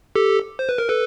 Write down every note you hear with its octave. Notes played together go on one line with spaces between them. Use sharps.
G4 A4
C5
B4
A#4
A4 B4